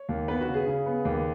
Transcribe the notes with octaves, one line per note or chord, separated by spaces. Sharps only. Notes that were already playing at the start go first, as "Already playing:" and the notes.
Already playing: C#5
D#2
B3 B4
F#4
C#3
G#4
C#3
B3
D#2